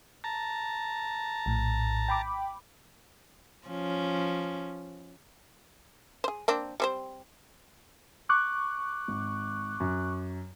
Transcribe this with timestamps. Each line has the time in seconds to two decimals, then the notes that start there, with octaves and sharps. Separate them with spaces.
0.24 A5 A#5
1.46 A#1 A2
2.08 G5 B5 D6
3.67 F3 C#4
6.24 G#4 C5
6.48 A#3 C4 D4
6.80 G3 C4 C5
8.29 C#6 D6 F#6
9.08 G#1
9.80 F#2